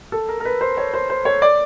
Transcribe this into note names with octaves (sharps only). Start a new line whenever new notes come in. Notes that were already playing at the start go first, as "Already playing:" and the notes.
A4
A#4
A#4
B4
C5
C#5
C5
C5
C#5
D5